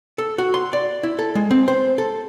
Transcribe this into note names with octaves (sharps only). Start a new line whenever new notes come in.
A4
F#4
C6
D5
E4
A4
G#3
C4
C5
A4